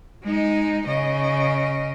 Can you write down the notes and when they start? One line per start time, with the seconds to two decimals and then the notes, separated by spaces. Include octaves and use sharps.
0.23 G#3 D#4
0.87 C#3 D#5